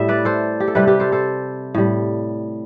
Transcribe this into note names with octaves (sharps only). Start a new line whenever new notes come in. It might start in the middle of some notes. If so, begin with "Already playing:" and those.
Already playing: A2 G3 E5
B4 D5
A4 C5
G4
A4
C3 G3 G4 B4
G4 B4
A4 C5
A4 C5
A2 G3